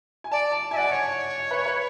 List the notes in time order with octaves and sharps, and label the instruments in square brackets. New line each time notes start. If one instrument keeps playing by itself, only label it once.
[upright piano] G#5
[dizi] D5 [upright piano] A5
[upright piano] A5
[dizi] E5 [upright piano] G#5
[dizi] D5 [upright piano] F#5
[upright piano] G#5
[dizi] C#5
[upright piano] B4
B4